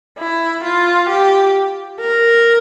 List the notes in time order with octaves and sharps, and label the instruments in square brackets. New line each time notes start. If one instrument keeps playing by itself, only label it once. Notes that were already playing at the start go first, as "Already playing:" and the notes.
[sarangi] E4
F4
G4
A#4